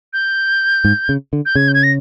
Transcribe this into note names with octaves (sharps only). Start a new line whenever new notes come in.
G6
G#2
C#3
D3
G6
C#3 G#6
G6
G#6
A#6